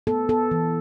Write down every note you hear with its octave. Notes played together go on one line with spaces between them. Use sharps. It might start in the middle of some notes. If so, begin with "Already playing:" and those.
B3 A4
B3 A4
E3